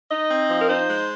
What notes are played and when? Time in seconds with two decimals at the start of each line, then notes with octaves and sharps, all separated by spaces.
0.10 D#4 D#5
0.30 C4
0.49 F3
0.58 A#4
0.69 D#4 C5
0.89 G#3